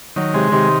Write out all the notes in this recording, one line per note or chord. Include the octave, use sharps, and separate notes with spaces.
D#3 F#3
C3 G#3
C3 D#3